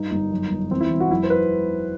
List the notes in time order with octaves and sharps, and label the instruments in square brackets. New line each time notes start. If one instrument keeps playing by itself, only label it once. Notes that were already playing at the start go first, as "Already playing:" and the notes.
Already playing: [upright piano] G2 D#4
G1 D#4
F#2
G1
E2 C4
E4
E1
F#4
F#2 E4
C5
B4